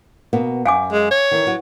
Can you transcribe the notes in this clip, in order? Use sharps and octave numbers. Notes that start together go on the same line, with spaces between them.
B2 A#3 B3
F#2 F5 G#5 D6
G#3
C#5
D#3 E3
F#3